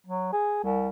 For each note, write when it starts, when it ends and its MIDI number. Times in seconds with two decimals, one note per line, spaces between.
0.06 0.31 54
0.33 0.59 68
0.63 0.88 36